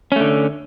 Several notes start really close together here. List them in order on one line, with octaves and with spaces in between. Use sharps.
C#4 A3 D3